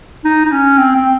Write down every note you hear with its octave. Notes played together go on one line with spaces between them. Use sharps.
D#4
D#4
C#4
C4
C4